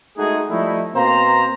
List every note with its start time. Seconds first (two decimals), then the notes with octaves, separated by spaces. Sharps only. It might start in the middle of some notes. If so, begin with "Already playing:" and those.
0.18 G#3 A3 D#4 F#4 G#4
0.49 F3 G3 A3 D#4 E4
0.95 B2 A#3 C4 C5 A#5